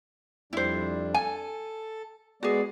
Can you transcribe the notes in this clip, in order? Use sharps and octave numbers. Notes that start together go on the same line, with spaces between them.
F2 G3 D4 E4 C5
A4 G#5 A5
G#3 B3 F#4 G#4 D5